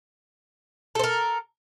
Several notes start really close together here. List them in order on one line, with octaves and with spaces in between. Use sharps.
A4 C5 A#4